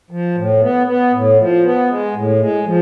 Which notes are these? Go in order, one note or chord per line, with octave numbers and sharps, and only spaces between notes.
F3
A2
B3
B3
A2
F3
B3
G#3
A2
G#3
F3